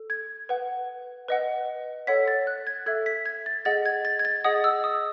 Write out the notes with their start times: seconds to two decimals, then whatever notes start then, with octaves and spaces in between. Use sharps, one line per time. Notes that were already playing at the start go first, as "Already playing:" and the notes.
Already playing: A4
0.10 G#6
0.49 B4 F#5
1.28 B4 D#5 F#5
2.07 A4 C#5 F#5 B6
2.28 A6
2.47 F#6
2.67 G#6
2.86 A4 E5 G#6
3.06 B6
3.26 G#6
3.46 A6
3.65 G#4 D#5 F#5 A6
3.85 G#6
4.05 A6
4.19 G#6
4.25 A6
4.44 G#4 D#5 F#5 D#6
4.64 E6
4.84 D#6